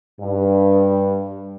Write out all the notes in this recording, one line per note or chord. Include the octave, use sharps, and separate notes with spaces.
G2